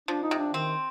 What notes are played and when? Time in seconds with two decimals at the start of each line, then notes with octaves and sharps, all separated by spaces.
0.08 F3 D4
0.23 D#4
0.31 C3
0.38 D4
0.54 D#3 C4